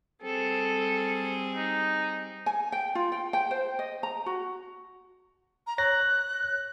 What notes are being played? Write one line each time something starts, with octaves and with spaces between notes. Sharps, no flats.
G3 C4 G#4 A4
D#4
G#5
G5
F4
G5
G5
C5
D#5
A#5
F#4
A#5
C#5 F#6 A#6